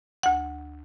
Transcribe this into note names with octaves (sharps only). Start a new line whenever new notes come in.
D2 F#5